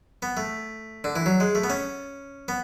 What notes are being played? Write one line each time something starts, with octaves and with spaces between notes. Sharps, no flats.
B3
A3
D3
E3
F#3
G#3
A3
B3
C#4
B3